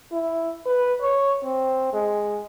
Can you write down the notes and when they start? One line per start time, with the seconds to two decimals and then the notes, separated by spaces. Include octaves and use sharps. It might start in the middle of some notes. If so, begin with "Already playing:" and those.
0.12 E4
0.66 B4
1.02 C#5
1.43 C4
1.93 G#3